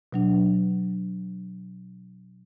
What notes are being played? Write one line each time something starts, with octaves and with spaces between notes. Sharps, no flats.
B2 F#3 D4